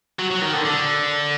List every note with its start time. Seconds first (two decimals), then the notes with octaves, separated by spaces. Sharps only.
0.19 F#3
0.31 F#3
0.42 D#3
0.53 D3
0.65 D3